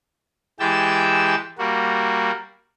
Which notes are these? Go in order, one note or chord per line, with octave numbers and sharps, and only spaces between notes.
E3 G#3 G4 G5 A5 E6
G3 A#3 F#4